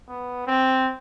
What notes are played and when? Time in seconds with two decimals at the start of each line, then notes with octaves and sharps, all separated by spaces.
0.08 B3
0.47 C4